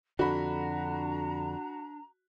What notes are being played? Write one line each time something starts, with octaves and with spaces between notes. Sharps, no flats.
F2 D3 D4 F#4 A#5 B5